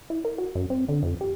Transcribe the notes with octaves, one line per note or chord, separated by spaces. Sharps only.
E4
A#4
F#4
F#2
C4
D3
F2
G4